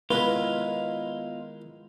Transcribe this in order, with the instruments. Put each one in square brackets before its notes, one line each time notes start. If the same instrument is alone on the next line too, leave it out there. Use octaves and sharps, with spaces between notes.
[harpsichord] D#3 G#3 E4 [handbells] B3 D#5 [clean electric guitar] F4 [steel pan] B4